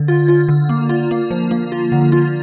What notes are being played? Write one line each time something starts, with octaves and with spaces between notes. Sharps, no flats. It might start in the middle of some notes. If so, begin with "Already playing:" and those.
Already playing: D3
F4
F4
D3
A#3
F4
A#3
F3
A#3
F4
D3
F4